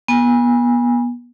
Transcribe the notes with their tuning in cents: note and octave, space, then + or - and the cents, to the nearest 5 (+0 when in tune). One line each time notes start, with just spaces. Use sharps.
B3 -30 G#5 -20